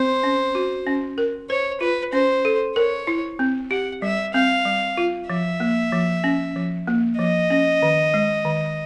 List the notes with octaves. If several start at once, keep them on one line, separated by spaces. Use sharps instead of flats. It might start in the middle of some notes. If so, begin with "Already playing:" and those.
Already playing: C4 C5
C#4
F#4
C#4
A#4
C5 C#5
F4 B4
C#4 C5
A4
A#4 C#5
E4
C4
G4 F#5
G3 E5
C4 F5
G3
F4
F3 E5
A#3
F3
C#4
F3
A#3
F3 D#5
C#4
D#3
G#3
D#3